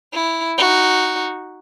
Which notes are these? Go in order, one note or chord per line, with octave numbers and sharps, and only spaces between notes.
E4
D#4 F#4